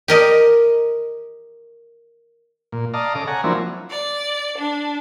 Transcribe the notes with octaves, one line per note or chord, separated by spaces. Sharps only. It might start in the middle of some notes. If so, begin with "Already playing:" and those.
G4 A#4 D#5
A#2
D5 D#5 F5 A5 A#5
C#3 A4 D6
C#5 F#5 G#5 A#5
F3 F#3 A#3 C4 D4 E4
D5
D4